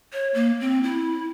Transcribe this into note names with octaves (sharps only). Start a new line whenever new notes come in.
C#5
A#3
C4
E4